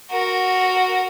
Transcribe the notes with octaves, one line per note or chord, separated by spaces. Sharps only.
F#4 A#4